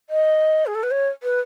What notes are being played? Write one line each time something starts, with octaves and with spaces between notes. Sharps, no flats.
D#5
G#4
A4
B4
C#5
B4